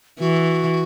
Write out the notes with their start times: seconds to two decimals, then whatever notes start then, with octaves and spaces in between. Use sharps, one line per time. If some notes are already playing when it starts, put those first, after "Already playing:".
0.20 E3 F#4